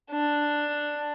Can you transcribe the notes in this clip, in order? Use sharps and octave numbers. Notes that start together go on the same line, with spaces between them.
D4